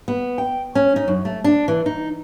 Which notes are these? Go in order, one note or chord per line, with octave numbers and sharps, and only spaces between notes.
B3
G5
C#4
D#4
F#2
A3
D4
E3
D#4